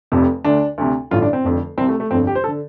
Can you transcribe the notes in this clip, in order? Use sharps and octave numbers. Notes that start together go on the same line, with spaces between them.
F1 F2 C3
D2 D3 D4
D2 C3
A1 G2 D3 F4
D4
C4
F1 F2 D3
C2 C3 C4
A3
A3
G1 F2 D3 C4
G4
C5
A4
D3